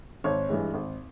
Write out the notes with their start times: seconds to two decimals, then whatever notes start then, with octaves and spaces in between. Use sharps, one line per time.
0.24 G#1 C#5
0.49 G2 E3 G#3
0.74 G#1